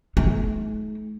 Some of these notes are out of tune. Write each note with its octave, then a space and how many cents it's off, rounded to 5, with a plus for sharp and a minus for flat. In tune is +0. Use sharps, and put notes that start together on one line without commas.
A3 -45 D#4 +30